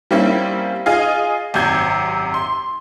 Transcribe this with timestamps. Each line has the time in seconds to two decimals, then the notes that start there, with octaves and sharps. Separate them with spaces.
0.11 G3 A#3 C4 C#4 E4
0.86 F4 G#4 D#5 F5
1.54 G#1 F#2 C3 G6 G#6
2.34 C6